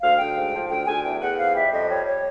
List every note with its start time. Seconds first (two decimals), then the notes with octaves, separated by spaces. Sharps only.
0.02 D2 F5
0.18 D2 G5
0.36 G#2
0.53 F3
0.69 D2 G5
0.87 D2 G#5
1.04 E2 G5
1.21 E2 F#5
1.39 F2 F5
1.55 G3 E5
1.72 F2 D#5
1.89 G3 C#5
2.07 C#5